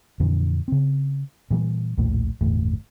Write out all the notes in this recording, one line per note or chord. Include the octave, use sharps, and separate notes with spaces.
F2 A#2 D3 E3
C#3 C4
A#2 E3 G3
A#1 D#2 A2
G1 E2 A2